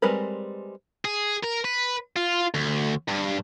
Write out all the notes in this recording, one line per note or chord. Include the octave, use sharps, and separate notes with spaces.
G3 G#3 C4 A#4 B4
G#4
A#4
B4
F4
D2
G2